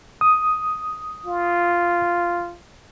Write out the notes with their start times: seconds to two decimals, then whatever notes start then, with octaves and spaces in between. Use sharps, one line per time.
0.21 D#6
1.26 F4